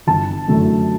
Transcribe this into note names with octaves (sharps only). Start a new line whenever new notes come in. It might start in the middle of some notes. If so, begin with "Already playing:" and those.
G1 A5
F#2 D3 F#3 A3